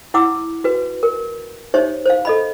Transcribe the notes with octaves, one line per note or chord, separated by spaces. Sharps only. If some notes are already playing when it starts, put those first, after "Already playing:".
E4 F#5 D6 E6
F#4 B4
A#4
D#4 G4 C5 C#5 E5
C5 F5
A4 D#5 B5